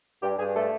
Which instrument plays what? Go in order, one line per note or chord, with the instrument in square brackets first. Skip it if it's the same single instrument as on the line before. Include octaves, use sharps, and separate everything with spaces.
[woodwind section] G2 G4
G2 G#4
A3 A4